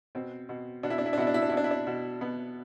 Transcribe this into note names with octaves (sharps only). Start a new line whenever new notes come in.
B2 C4
B2
B2 D4
E4
D4
E4
D4
B2 E4
D4
E4
D4
B2 E4
D4
E4
D4
B2
B2 B3